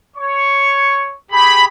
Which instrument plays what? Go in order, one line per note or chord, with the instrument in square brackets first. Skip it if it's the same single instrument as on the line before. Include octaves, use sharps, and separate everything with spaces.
[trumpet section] C#5 C#6
[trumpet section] G4 G#4 [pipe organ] B5